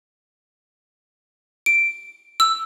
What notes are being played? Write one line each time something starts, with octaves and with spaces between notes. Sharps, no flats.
D7
E6